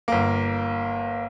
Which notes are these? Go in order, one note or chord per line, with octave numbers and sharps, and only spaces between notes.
G1 A#3